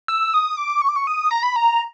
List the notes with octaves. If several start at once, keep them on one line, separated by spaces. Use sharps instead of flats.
E6
D#6
D6
C#6
D6
C#6
D#6
A#5
B5
A#5